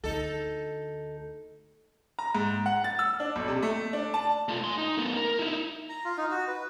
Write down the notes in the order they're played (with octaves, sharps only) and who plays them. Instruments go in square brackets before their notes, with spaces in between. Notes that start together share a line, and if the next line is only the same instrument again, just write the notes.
[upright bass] D2 [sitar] D#4 A4
[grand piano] A#5
G#2
F#5
A6
E6
D4
B1
C3
A3
D4
A5
[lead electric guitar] A3 F4
G#5 C6
D#4
A3 B3
A#4
D#4 E4
[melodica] A#5
F4
D#4
F#4
B4